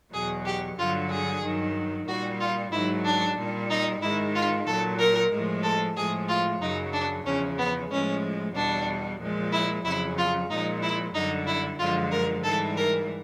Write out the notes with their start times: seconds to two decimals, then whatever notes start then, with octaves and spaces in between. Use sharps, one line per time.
0.13 E2 B2 F#3 G#4
0.45 G4
0.77 G2 D3 F#3 F4
1.10 G#4
1.43 G2 D#3 F#3
2.07 A#2 G3 F#4
2.40 F4
2.71 G#2 D#3 F#3 E4
3.05 D4
3.37 A#2 G3
3.70 D#4
4.01 G#2 D#3 G#3 E4
4.34 F4
4.66 A#2 F#3 A4
4.98 A#4
5.31 A2 F3 G#3
5.63 A4
5.95 A2 F3 G#3 G#4
6.28 F4
6.60 F#2 C#3 F#3 D#4
6.93 D4
7.25 E2 C#3 F3 C#4
7.58 B3
7.90 A2 F3 G#3 C#4
8.54 E2 B2 G3 D4
9.20 A#2 F3 G#3
9.52 E4
9.84 F2 C#3 F#3 E4
10.17 F4
10.49 A#2 F3 G#3 D#4
10.82 E4
11.14 F#2 D3 G3 D#4
11.47 E4
11.79 F#2 D3 F3 G#3 F4
12.11 A#4
12.43 G#2 E3 G3 A4
12.76 A#4